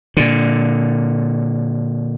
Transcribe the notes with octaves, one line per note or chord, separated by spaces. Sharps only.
A#2 D3